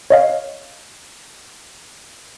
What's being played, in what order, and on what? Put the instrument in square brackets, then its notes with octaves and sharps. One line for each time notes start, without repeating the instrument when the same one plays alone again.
[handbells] C#5 D#5 F5